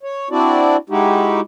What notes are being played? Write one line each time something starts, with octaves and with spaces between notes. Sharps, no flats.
C#5
C4 D4 E4 F#4 D5
G#3 D#4 E4 F#4 G4